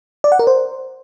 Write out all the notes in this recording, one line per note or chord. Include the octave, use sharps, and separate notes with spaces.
D5
F#5
A#4
C5